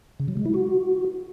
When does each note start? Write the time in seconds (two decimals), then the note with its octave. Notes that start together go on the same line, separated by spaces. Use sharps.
0.20 C#3
0.28 F#3
0.37 G#3
0.45 E4
0.54 F#4